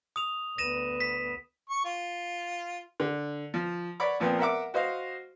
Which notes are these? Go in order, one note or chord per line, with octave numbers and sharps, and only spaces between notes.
D#6 F7
D2 B3 A#6 D#7 E7
B6
C#6
F4
D3
F3
C#5 D5 F#5 B5 D6
A#2 F3 B3 C4
A#4 E5 F#5 D6
F#4 C5 D#5 F5